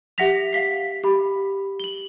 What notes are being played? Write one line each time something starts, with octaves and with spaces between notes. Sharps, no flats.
G4 E5 F#5 A#6 B6 F7
F5 B6 C7
G4 B5
F#7 G7